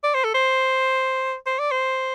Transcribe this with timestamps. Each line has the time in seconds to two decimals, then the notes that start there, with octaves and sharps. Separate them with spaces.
0.03 D5
0.14 C5
0.24 A4
0.34 C5
1.46 C5
1.59 D5
1.71 C5